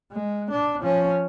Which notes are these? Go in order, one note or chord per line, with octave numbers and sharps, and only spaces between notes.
G#3
D4
F3 C#4